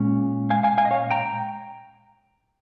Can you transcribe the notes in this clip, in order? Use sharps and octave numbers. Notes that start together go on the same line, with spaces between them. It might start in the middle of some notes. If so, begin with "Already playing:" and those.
Already playing: A#2 G#3 C#4
F5 G#5
F5 G#5
F5 G#5
D#5
C#5 F5
G5 A#5